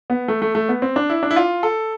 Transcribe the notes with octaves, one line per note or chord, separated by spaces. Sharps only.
B3
A3
A3
A3
B3
C4
D4
E4
D4
E4
F4
A4